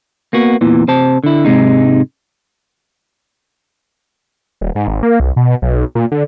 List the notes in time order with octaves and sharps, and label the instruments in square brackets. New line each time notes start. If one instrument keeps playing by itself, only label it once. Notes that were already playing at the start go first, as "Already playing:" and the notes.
[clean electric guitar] A#3 B3 F#4
E2 A#2 E3
C3 C5 A5
D3 E4
G#2 C3 G#3 D#4
[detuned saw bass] D#1
G#2
G#1
A#3
C2
B2
B1
A#2
D3